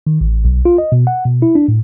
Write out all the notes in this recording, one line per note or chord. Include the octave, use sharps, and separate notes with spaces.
D#3
A1
B1
F4
D#5
B2
F#5
B2
E4
D4
A2